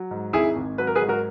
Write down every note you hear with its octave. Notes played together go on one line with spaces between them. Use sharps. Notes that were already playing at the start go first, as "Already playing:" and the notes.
Already playing: F#3
G#2
G#1 E4 G#4
G#1
F#3 B4
A#4
G#4 B4
G#2
F#4 A#4